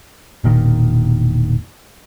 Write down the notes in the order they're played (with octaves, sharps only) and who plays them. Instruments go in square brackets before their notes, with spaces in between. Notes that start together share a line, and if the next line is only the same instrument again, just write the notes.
[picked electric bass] E1 A#2 D#3